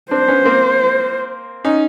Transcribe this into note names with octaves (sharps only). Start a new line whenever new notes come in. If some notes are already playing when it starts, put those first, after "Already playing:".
C4 D4 C5
B3 C#4
A#3 C4
C#4 D#4